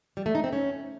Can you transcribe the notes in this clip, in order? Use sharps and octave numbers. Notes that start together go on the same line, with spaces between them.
G3
A3
D#4
C4
C#4